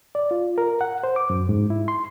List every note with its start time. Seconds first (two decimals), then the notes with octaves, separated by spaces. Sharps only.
0.15 D5
0.31 F4
0.58 A#4
0.81 F#5
1.04 C5
1.16 D6
1.30 F#2
1.49 G#2
1.70 E4
1.88 C6